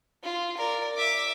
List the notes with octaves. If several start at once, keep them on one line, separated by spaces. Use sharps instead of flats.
F4
A#4 D5
E5 D6